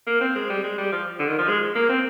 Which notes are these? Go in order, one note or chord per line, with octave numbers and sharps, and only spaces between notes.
A#3
C4
G#3
G3
G#3
G3
F3
D3
D#3
F3
G#3
A#3
C4